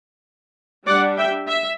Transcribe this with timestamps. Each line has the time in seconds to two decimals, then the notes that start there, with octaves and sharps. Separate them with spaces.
0.87 G3 D4 D5 F#5
1.17 E5 G5
1.47 E5